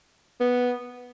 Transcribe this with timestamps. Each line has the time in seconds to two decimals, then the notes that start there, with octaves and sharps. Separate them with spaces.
0.40 B3